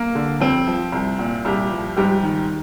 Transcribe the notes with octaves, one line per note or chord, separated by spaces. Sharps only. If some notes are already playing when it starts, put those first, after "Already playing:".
Already playing: A#3
D3
F2 C4
F3
C2
A#2
C2 G3 G4
F3
G#2 G3 G4
D#3